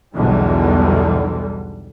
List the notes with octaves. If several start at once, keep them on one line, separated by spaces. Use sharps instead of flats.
B1 E2 G#2 D3 G3